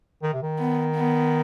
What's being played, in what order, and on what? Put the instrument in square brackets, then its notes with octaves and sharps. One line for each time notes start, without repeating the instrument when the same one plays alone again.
[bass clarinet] D#3
C3
D#3
[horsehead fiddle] B3
B3